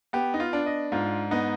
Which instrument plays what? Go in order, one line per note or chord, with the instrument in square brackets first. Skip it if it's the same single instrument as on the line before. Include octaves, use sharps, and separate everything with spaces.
[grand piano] B3 G4
D#4
F4
D4
D#5
G#2 F4
B3 D#4